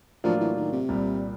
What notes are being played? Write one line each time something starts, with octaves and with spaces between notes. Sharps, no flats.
A2 F3 F#3 A#3 D4 F4
E3
D#3
C3
C2 A#2 G3